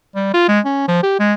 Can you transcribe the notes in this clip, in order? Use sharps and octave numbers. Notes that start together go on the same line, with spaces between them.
G3
F4
G#3
C#4
F3
G4
G#3